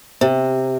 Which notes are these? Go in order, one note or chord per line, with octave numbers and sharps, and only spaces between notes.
C3